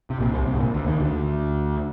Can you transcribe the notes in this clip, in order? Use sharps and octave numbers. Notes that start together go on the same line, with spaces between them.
C3
A#1 A#2
C2 C3
C2 C3
G#2
A#1 A#2
D2 D3
D#2 D#3
D2 D3